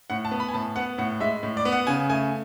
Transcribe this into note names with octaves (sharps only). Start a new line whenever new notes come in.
A2 F#5
A5
B3
B5
G#5
A2 A5
B3 F#5
A2 F#5
G#3 E5
A2
D5
B3
F#5
C#3 G#5
A3 G#5